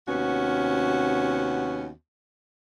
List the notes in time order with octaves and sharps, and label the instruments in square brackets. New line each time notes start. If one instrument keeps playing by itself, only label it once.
[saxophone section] D#2 C3 B3 C#4 F#4